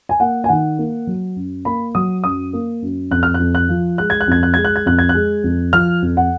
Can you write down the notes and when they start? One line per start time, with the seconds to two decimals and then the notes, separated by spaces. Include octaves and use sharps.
0.09 G#5
0.20 A#3 F#5
0.44 G#5
0.49 D#3 F#5
0.78 A#3
1.07 F#3
1.36 F#2
1.65 A#3 B5
1.95 F#3 D#6
2.24 F#2 D#6
2.53 A#3
2.82 F#2
3.11 F2 F#6
3.23 F6
3.34 F#6
3.40 F2
3.55 F#6
3.69 F3
3.98 G#3 F#6
4.10 G#6
4.21 F#6
4.28 F2 G#6
4.43 F#6
4.54 G#3 G#6
4.65 F#6
4.76 G#6
4.86 F2 F#6
4.99 G#6
5.09 F#6
5.14 G#3
5.44 F2
5.73 F3 F6
6.02 F2
6.17 F#5